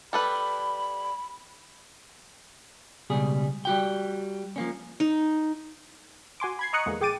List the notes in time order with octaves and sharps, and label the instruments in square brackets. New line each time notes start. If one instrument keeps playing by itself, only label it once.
[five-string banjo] G3 A4 B4 [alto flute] B5
[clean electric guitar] C#2 B2 G3 G#4
G3 F#4 G5
F3 A#3 C#4
[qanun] D#4
[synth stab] F#4 G#5 C6 D6
B5 G#6 C7
D#5 A#5 C#6 D#6 F#6 C#7
E2 D3 G#3 A#3
A#1 G#4 G5 D6 A6 D#7